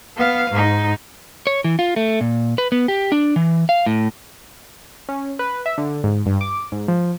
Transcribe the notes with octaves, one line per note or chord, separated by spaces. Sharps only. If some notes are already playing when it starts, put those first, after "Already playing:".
B3 F5
G#2 D#4
C#5
E3
F4
A3
A#2
B4
B3
G4
D4
E3
F5
A2
C#4
B4
E5
D3
G#2
G2
D6
G#2
F3